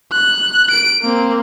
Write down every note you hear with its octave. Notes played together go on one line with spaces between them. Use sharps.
F#6
D7
A#3 C4